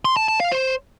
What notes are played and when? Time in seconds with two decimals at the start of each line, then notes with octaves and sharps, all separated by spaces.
0.05 C6
0.17 A5
0.28 A5
0.40 F5
0.52 C5